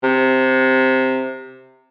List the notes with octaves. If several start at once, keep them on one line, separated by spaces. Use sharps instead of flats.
C3